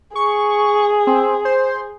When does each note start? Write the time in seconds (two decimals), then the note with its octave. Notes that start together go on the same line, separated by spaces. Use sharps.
0.15 G#4 C#6
1.07 C4
1.45 C5